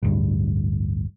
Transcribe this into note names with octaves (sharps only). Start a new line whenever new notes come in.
A1 D2 G2